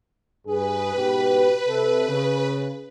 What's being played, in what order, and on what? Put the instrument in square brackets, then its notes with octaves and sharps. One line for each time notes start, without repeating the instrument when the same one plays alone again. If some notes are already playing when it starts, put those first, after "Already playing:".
[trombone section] G2 G#4 [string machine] B4
[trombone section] G#2 B2 G4
C3 A4
C#3